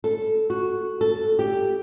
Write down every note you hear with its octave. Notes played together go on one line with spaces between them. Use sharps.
A4
F#4
A4
G4